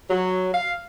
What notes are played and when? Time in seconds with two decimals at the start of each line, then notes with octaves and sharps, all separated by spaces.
0.10 F#3
0.54 F5